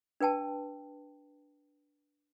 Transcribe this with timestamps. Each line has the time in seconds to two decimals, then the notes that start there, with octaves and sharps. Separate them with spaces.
0.20 D4 B4 G5 A5